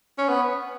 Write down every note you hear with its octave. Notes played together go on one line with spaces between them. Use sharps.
C#4
B3